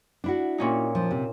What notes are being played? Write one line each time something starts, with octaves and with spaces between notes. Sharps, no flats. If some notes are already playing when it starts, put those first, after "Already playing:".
D4 E4 F#4
A#2 C#4 D#4
F3
C3